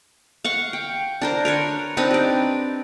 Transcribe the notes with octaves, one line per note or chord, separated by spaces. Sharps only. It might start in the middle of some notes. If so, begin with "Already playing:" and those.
F5 F#5 C#6
G5
D4 A#4 C5
A#4 B4 C#5
C4 D4 D#4 B4
G4 D5